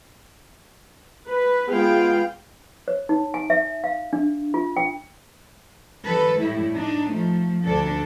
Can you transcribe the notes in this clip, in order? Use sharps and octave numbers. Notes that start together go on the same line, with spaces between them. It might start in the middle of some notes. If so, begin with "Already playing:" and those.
B4
G#3 B3 F4 G#4 F5 G5
C#5
D#4
G#5
E5
F5
D4
F4
G5
D#3 G3 A4 B4
A2 G3 A3 E4
D4 D#4
F3 A3
D2 D4 A4